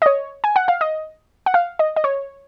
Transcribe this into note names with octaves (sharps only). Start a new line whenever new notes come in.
D#5
C#5
G#5
F#5
F5
D#5
F#5
F5
D#5
D#5
C#5